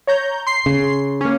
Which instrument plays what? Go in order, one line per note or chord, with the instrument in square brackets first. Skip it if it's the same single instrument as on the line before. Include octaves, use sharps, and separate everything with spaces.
[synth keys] C#5 A#5 G6
C6 C7
[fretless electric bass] C#3
[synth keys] A#3 C#4